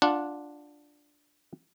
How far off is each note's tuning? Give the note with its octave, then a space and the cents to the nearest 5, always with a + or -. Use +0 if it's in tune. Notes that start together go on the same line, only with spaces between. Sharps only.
D4 +0 F4 +5 F#5 -15